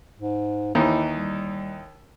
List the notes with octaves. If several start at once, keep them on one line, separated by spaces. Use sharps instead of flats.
G#2
D#2 E3 D#4 E4
G3